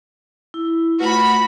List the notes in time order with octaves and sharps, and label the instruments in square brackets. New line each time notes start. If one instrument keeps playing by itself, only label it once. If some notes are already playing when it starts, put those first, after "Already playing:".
[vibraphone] E4
[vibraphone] A3 F4 B4 [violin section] F#4 B5